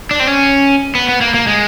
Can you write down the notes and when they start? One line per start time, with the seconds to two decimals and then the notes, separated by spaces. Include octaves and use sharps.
0.11 D4
0.20 C4
0.27 C#4
0.95 B3
1.09 B3
1.21 A#3
1.34 A#3
1.47 G#3